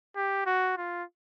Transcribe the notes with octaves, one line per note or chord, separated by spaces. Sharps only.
G4
F#4
F4